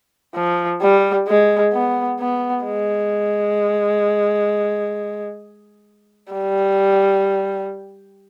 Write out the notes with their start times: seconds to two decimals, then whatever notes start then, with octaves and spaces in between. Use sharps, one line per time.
0.35 F3
0.82 G3
1.28 G#3
1.73 B3
2.20 B3
2.65 G#3
6.33 G3